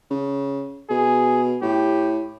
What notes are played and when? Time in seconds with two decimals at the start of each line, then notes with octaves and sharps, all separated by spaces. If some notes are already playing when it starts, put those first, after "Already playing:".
0.11 C#3
0.90 B2 G#4
1.62 A2 G4